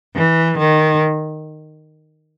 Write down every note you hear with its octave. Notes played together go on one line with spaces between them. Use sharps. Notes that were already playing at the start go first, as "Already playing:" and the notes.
E3
D#3